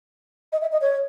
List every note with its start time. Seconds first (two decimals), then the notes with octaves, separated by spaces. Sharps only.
0.52 D#5
0.62 E5
0.72 D#5
0.81 C#5